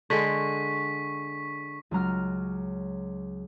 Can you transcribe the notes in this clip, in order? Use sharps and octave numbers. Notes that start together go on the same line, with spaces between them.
D3 G#3 C#6 B6
C#2 F#3 A#5 F6